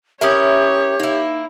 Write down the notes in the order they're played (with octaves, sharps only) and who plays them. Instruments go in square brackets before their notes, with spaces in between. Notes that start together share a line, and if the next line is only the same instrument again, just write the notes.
[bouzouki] C#4 E4 A#4 [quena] G4 [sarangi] C#5 [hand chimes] E5 D#6
[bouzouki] A#3 E4 [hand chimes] D#4